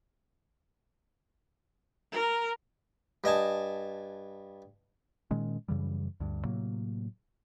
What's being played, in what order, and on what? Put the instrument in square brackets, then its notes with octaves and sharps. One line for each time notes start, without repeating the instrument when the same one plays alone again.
[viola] A#4
[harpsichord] G2 D#5 G#5 A5
[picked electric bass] A#2 D#3 G#3 C#4
F#2 C#3 E3 G3
D2 G2
A2 C3 F#3 A#3